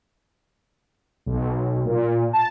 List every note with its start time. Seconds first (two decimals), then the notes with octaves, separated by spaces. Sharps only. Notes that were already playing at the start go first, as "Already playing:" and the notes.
1.26 B1
1.86 A#2
2.33 A5